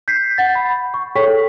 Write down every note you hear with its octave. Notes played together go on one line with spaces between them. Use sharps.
G6 B6 C7
F#5 A6
B5
C#6
G#4 A4 C#5 G5 C#6 B6
A4